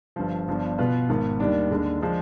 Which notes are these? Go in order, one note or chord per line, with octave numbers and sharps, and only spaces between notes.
G1 G2 F3
G1 G2 F3 B3 D4
B2 B3 F4 B4
G#1 G#2 D#3 B3
D#2 D#3 G3 D4
D#2 D3 G#3 D4
F3 G#3 D4